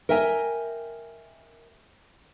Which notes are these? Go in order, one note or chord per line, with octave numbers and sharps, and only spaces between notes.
A#4 D#5 E5 G5 G#5